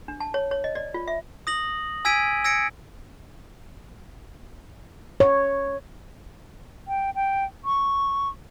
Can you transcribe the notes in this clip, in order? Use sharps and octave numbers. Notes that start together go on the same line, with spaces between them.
D4
A5
C#5
C#5
D#5
D5
F4
E5
D#6 A#6 F#7
G#5 E6 G#6 B6 D7 D#7
E6 G#6 A#6 C#7 D7
C#5
G5
G5
C#6